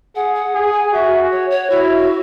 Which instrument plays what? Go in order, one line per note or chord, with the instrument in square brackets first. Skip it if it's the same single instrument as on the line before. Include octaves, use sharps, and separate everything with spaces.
[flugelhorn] G#4 [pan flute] F#5
[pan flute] F#5
[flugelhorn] G#4
[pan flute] G#5
[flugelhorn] F#4 [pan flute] E5
[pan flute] C#5
C#5
[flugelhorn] E4 [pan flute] F#4